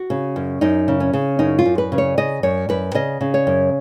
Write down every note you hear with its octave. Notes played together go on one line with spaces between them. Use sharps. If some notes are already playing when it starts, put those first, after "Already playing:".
Already playing: F#4
C#3
F#2
F#2 D#4
C#3
C#4
C#3
F#2 D#4
F4
F#2
B4
C#3
C#5
C#3 D#5
F#2 C#5
F#2 B4
C#3 D#5
C#3
C#5
F#2